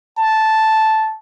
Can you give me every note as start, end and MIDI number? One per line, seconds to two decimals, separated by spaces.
0.18 1.16 81